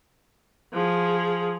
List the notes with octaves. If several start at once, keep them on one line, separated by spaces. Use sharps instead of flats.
F3 G#4